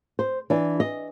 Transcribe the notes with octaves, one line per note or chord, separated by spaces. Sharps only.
C5
E3 D4
D#5